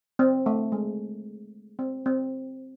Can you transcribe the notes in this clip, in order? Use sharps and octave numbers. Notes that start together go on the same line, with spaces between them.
C4
A3
G#3
C4
C4